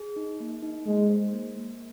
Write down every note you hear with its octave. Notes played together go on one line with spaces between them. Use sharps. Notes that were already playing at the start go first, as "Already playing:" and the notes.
Already playing: G#4
D#4
A#3
D#4
G#3 A#3
C5
A#3
A#3